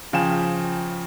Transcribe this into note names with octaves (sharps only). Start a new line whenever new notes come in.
C#3 F3 F5 G5 G#5 E7